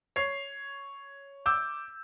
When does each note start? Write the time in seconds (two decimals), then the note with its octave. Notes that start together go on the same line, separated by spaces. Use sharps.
0.16 C#5 C7
1.46 D6 E6 G6